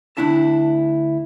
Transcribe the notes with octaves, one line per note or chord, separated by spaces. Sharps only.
D2 B3 D4 E4 E5 A5